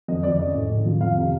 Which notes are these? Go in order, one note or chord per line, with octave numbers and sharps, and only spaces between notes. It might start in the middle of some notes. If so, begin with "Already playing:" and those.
F2 D#5
F2 D5
C#3 D#5
A2
A2
F3
F2 F5
C3 F5